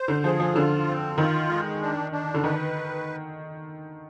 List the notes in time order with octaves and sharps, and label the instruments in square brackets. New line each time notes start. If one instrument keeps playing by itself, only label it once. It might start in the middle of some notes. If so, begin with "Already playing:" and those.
Already playing: [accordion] C5
[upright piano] D3
[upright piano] F3 [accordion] G#4
[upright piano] F3
[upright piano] D3 [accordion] F4
[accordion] C4
[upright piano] D#3 [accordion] F4
[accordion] G#3
D4
D4
[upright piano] D3
[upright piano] D#3 [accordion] B4